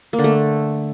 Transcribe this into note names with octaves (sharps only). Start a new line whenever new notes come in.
A#3
D3
A3